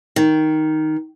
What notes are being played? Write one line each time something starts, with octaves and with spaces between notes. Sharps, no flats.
D#3